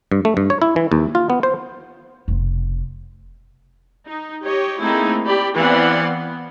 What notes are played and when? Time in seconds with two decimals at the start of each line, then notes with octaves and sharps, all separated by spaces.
0.12 G2
0.25 A3
0.37 G2
0.50 C#5
0.62 E4
0.76 E3
0.92 D#2
1.15 F4
1.30 B3
1.43 C5
2.28 F1 B2
4.06 D#4
4.45 G4 C#5 D#5
4.80 A3 A#3 C4 D#4 E4 G#4
5.26 G4 D5 B5
5.57 E3 B3 C4 D5 F5 F#5
6.04 B3